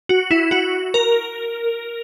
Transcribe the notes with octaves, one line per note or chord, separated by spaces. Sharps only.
F#4
E4
F#4
A#4